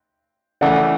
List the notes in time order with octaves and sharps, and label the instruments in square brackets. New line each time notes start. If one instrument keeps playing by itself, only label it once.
[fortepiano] C#3 E3 A3 [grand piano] D5 F#5